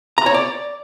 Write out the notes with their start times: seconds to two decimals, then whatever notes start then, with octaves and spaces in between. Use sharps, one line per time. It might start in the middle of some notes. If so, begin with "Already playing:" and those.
0.18 A#5
0.26 C#5
0.34 D5